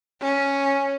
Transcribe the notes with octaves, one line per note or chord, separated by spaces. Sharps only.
C#4